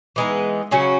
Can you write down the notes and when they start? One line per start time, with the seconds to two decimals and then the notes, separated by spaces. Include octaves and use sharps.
0.16 E3 G#3 B3 D#4
0.71 C#3 F#3 C#4 F#4